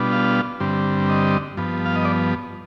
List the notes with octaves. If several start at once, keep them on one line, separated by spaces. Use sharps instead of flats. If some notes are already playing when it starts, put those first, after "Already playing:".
Already playing: B2 G3 B3 D4 F4
F5
G2 D3 G3 C4
D#5
G2 F3 B3
F5
D#5
D5